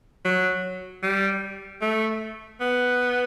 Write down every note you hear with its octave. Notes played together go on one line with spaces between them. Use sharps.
F#3
G3
A3
B3